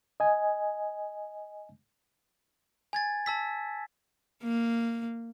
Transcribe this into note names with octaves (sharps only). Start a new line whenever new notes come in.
D#5 G#5
G#5 G#6 A6
A5 E6 B6
A#3